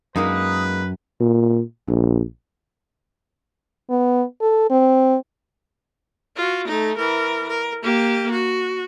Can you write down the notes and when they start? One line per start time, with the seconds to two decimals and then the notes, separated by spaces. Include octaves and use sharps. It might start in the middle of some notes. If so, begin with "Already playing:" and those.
0.16 F#2 G#3 A#3 D#4 B4 D#6
1.20 A#2
1.88 A#1
3.90 B3
4.41 A4
4.70 C4
6.36 F4 F#4
6.67 A3 D#4
6.97 E3 A#4
7.49 A#4
7.83 A#3 G4
8.31 F#4